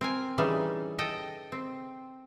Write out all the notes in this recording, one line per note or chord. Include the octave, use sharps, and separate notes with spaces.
C4 A#4 G#5
C#3 E3 G3 D#4
A4 D#5 G5
C4